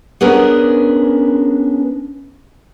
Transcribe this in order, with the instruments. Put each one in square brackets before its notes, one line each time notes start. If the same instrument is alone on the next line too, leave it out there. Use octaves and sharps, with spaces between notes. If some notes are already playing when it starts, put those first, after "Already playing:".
[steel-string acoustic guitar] B3 C#4 D4 G#4 A#4 B4